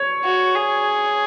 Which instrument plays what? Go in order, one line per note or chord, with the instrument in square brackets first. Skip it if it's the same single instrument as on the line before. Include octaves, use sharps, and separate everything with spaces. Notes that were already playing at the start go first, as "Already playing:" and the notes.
Already playing: [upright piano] C#5
[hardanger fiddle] F#4
G#4